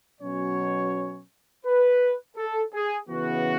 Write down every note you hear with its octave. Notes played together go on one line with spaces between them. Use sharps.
B2 F#3 C#4 C#5
B4
A4
G#4
C#3 E3 B3 F#4